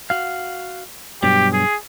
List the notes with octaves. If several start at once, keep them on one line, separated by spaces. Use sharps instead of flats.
F#4 F5
G2 B2 F#3 G4
G#4